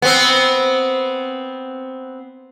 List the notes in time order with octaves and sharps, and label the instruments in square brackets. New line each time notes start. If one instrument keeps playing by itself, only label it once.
[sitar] B3 C4